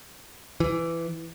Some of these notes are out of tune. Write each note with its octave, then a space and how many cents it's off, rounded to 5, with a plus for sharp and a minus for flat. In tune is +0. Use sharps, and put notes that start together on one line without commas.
E3 +15